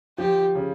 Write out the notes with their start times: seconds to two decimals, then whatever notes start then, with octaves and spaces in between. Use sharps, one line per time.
0.18 F3 G4
0.55 C#3